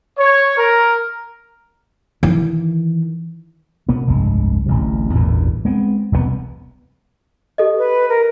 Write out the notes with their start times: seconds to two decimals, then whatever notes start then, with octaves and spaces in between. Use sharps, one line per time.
0.18 C#5
0.57 A#4
2.23 D#3 E3
3.89 B2 A#3 B3
4.07 F1 C2 G2 G#3
4.66 D1 A1 C3
5.15 A1 E2 G2 A#2
5.65 G#3 B3 C4
6.12 E1 C2 A#2 B3
7.58 G4 A4 D#5
7.78 B4
8.09 A#4